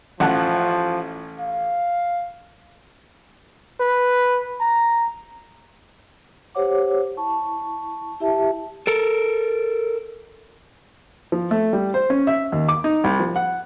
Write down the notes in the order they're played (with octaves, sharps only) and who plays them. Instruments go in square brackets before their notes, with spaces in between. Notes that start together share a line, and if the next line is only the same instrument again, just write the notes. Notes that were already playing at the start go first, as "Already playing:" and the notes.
[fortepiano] A1 F#5 A5 [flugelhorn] F3
[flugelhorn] F5
[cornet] B4
A#5
[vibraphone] G4 C5 C#5 F#5 D6
E4 A5 C#6
E4 G4 E5 A5
[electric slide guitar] A4 A#4
[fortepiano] F3
A3
G3
C5
C#4
E5
D#2
D6
D#4
C2
F3
F#5